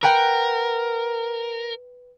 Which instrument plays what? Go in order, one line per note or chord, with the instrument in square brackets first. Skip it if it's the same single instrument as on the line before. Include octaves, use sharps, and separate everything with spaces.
[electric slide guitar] A#4 [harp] B4 F#5 G5